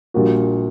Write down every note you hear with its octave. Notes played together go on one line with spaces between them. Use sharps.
A#1 A#2 G3 A#3 F#4